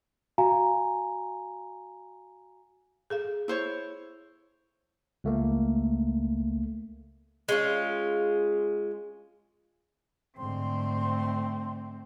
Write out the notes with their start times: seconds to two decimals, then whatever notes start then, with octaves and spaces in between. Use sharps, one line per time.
0.38 F#4 F5 G#5 A#5
3.10 G#4 A4 F5
3.48 E4 C5 C#5
5.24 C#2 A3 A#3
7.49 G#3 C#4 F4
10.38 G#2 D3 A3 C4 C6